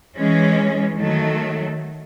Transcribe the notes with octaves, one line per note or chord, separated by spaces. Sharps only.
E3 G#3 C#4
D#3 F#3 A3